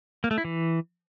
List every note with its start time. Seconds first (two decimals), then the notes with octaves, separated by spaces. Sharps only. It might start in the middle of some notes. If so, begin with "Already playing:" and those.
0.24 A#3
0.31 A3
0.38 E4
0.45 E3